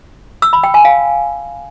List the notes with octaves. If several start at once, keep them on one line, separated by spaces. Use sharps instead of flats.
E6
B5
G5
G#5
F5